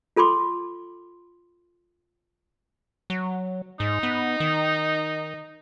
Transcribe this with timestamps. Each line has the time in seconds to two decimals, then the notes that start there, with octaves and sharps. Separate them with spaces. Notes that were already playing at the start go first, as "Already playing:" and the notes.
0.16 F4 A4 B5 C6 D6
3.10 F#3
3.80 G#2 D#4
4.03 B3
4.40 D#3